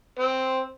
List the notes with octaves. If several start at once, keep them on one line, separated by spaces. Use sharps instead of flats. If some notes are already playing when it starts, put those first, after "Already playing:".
C4